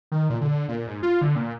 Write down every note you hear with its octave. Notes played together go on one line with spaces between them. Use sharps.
D#3
A#2
D3
A#2
G#2
F4
D3
A#2